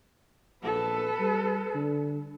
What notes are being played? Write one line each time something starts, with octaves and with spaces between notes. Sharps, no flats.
A#1 A4 B4
G3
D3